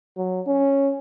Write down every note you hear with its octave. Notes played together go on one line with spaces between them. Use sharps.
F#3
C#4